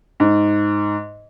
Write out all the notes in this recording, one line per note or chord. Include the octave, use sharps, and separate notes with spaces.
G#2